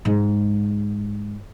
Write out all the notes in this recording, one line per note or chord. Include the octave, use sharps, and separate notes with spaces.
G#2 G#3